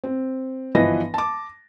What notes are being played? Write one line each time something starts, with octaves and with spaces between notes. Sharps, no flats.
C4
G1 E3 F3 B4 D#5 A#6
A5 D6